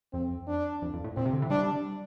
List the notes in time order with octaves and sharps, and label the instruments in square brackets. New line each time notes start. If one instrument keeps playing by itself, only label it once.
[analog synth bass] F2 [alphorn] C4
[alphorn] D4
[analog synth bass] F2
F2
A2
[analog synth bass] A#2 [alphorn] C4
[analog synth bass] C3
D3
E3
[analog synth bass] G3 [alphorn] D4